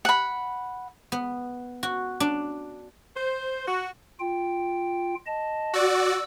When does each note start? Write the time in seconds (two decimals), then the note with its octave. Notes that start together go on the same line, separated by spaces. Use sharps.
0.05 F#5 B5
1.12 B3
1.83 F#4
2.20 D4
3.15 C5
3.67 F#4
4.20 F4 G5
5.26 D#5 A5
5.73 F#4 D5 E6